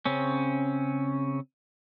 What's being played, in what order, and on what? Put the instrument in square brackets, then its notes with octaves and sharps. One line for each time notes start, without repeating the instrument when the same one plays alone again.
[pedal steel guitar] C#3 C4 C#4